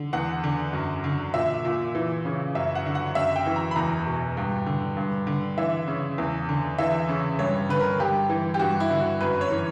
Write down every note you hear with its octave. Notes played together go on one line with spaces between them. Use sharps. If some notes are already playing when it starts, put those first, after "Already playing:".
Already playing: D3
E2 F#5
D3
F#2
D3
A#2 E5
A#2
E3
C#3
F#2 E5
F#5
D3
F#5
F#2 E5
G5
E3
A#5
B5
E2 A#5
B2
G2
D3
G2
D3
E3 E5
C#3
E2
D3
E3 E5
C#3
G2 C#5
D3 B4
A#4
G2 G4
E3
G4
G2 F#4
E4
D3
F#4
F#2 B4
C#5
E3